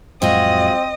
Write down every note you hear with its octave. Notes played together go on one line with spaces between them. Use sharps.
F2 A2 F#3 G#3 C4 F4 F#4 D#5